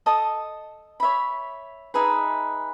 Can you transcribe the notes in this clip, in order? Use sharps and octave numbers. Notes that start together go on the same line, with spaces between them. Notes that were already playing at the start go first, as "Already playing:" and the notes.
A4 D#5 A5 D#6
C#5 E5 B5
D#4 G#4 B4 E5